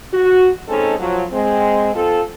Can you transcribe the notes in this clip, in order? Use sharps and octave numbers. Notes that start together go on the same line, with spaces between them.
F#4
G#3 C4 C#4 D#4 A4
F3 F#3
G#3 C4
F3 C4 F4 A4